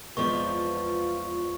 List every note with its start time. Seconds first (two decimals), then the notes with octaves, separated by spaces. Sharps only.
0.17 E2 F3 G#3 B3 C4 F4 D5 C#6